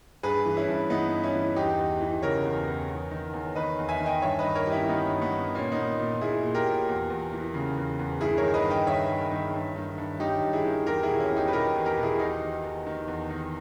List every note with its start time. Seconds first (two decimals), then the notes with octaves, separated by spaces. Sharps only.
0.23 G2 G#4 B4
0.46 E3
0.57 C#4 E4
0.68 G2
0.90 E3 B3 D#4
1.12 G2
1.24 C#4 E4
1.34 E3
1.56 E2 D#4 G4
1.78 E2
2.01 E3
2.22 C#3 A#4 C#5
2.45 E2
2.67 E2
2.89 E2
3.11 D#3
3.33 E2
3.55 D#3 B4 D#5
3.78 E2
3.89 E5 G#5
4.00 D#3
4.06 D#5 G5
4.22 G2 C#5 E5
4.39 B4 D#5
4.44 D#3
4.55 A#4 C#5
4.67 G2 G4
4.72 C#4 E4
4.89 D#3 B3 D#4
5.11 G2
5.22 B3
5.33 D#3
5.55 A#2 A#3 C#4
5.72 B3 D#4
5.77 A#2
6.00 A#2
6.21 A#2 E4 G#4
6.43 A#2
6.55 G4 A#4
6.66 A#2
6.89 E2
7.10 E2
7.32 E3
7.54 C#3
7.77 E2
7.99 E2
8.21 G2 E4 G#4
8.37 A#4 C#5
8.43 D#3
8.54 B4 D#5
8.65 G2
8.70 D#5 G5
8.87 D#3 C#5 E5
9.10 G2
9.31 D#3
9.53 G2
9.76 D#3
9.98 G2
10.20 D#3 D#4 G4
10.42 G2
10.53 E4 G#4
10.65 D#3
10.86 E2 G4 A#4
11.03 E4 G#4
11.09 B2
11.20 C#4 E4
11.31 E2
11.36 D#4 G4
11.48 B4
11.53 B2 G4 A#4
11.75 E2
11.86 G4 A#4
11.98 B2
12.03 E4 G#4
12.19 E2 D#4 G4
12.42 D#3
12.64 E2
12.86 D#3
13.08 E2
13.30 D#3